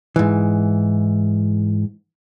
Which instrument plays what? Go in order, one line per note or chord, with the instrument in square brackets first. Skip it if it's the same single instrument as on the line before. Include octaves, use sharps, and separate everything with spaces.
[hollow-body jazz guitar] G#2 E3